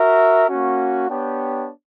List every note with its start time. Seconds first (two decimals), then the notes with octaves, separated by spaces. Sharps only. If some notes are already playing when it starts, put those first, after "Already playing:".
Already playing: F#4 A#4 E5
0.48 A#3 C#4 F#4
1.09 B3 D4 G4 C#5 G5